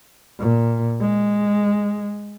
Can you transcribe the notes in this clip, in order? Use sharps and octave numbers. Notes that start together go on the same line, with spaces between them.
A#2
G#3